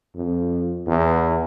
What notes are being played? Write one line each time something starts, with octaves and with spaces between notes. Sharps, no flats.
F2
E2